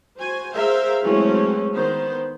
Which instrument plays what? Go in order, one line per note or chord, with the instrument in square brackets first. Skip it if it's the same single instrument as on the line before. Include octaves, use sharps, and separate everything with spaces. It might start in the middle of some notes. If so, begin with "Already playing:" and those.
[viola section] F#4 C5 G#5
G#4 A#4 C5 E5 F5
E3 F#3 G#3 A3 C4 C#4
D#3 B3 C5